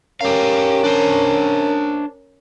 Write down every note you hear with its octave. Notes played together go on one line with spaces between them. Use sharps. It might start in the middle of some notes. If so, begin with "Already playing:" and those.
C#4 G4 A#4 F5
D4 C5